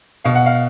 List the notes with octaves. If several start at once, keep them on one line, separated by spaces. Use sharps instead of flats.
B2 F5
F#5
F5